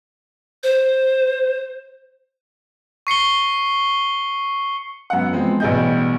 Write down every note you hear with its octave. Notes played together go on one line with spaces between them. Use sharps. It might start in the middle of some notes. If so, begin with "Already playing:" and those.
C5
C#6 C7 C#7 G7
F#2 B3 F#5
F3 G#3 B3 C4
A1 B2 G3 G#4 D#5 G6